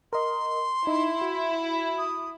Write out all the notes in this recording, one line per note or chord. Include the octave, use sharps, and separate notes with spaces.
A#4 D#5 C6
D#4 E4
F#4
D#6